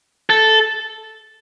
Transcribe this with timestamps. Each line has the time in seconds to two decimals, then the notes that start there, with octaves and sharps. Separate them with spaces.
0.30 A4